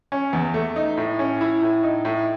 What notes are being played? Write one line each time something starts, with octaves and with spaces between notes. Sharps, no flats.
C#4
E2
A3
D#4
A2
C#4
E4
A2
D#4
A2